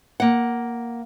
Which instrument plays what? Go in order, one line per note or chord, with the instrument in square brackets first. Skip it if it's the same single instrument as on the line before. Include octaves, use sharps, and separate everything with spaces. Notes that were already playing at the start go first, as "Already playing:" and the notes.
[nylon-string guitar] A#3 F#5